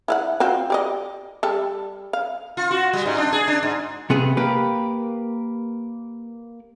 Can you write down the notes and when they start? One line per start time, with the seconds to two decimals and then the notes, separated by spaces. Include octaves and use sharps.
0.08 E4 F5 F#5
0.40 C4 F4 F#4
0.70 G4 D5 D#5
1.43 G3 A4
2.13 F5
2.57 F4
2.71 F#4
2.93 G3
3.06 G#2
3.18 D4
3.32 G#4
3.48 D4
3.63 G#2
4.10 C3 B3 G#4
4.37 A#3 G4 B4